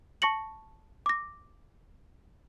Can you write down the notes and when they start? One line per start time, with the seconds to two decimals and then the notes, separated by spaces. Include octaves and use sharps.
0.22 A5 C#6 A#6 C#7 F#7
1.06 D6 A#6